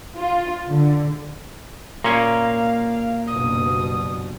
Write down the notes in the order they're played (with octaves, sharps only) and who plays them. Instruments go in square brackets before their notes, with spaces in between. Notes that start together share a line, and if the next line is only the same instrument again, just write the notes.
[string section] F4
D3
[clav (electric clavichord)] A#2 C#4 [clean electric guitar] A#3 [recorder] F5
[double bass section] F#1 G2 B2 [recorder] D#6